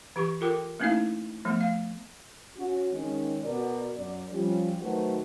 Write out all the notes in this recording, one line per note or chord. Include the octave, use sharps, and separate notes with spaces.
E3 G4 C#6
F4 A4 A#4 G5 D6
A3 A#3 C#4 D#4 E4 F5
F3 A3 B3
F5
C#4 F#4
D#3 G#3 C#4
B2 F#4 A#4 D5
F#2 D5
F3 G3 C#4
D#3 F#3 A3 F#4 B4 C5